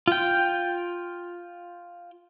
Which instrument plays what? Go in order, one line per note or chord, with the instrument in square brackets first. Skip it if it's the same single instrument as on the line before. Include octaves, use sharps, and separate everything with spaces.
[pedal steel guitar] F4 G5